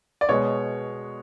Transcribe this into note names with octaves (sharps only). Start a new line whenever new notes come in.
D5
B2 G#3 B3 C#5